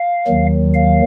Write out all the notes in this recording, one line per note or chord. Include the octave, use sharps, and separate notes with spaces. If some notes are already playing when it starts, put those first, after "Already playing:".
Already playing: F5
D#2 D#3 F#3
F5